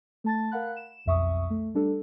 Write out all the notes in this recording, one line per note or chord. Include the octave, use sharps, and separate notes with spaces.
A3 A5 A6
A#4 F5 F#5 B5 F#6
E7
B1 F2 E5 C#6 D#6
A3
G3 D4 A4